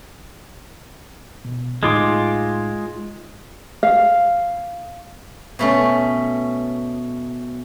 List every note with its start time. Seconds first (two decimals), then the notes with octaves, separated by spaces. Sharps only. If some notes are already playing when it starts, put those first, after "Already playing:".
1.45 B2
1.83 A2 G#3 D#4 F4 D6 D#6
3.83 F5
5.59 B2 A3 C#4